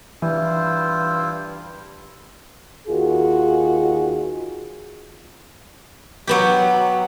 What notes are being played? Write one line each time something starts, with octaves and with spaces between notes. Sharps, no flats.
G2 E3 E4 F4 C5
D#2 D#3 F4 F#4 G#4
F#3 B3 G4